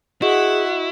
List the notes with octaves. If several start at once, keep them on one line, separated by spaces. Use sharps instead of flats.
E4 F#4 G#4 D#5 F#5 C#6